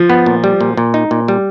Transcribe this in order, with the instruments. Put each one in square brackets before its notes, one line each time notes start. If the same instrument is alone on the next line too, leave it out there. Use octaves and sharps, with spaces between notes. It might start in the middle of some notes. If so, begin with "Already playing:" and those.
Already playing: [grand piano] F3
[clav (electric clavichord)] B3
A#2
G3
A#2
A#2
D#4
A#2
G3